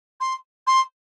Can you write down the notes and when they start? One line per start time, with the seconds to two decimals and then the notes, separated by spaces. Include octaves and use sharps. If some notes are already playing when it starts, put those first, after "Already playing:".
0.20 C6
0.67 C6